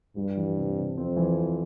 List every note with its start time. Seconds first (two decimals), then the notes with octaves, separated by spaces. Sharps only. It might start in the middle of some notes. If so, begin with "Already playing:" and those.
0.16 G2 G3
0.37 E3
0.57 C3
0.77 C3
0.97 F2 C4
1.17 E3
1.37 C4